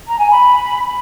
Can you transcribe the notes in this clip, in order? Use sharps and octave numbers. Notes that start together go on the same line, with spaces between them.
A#5
G#5
B5